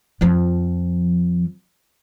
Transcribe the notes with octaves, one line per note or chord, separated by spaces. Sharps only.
F2 F3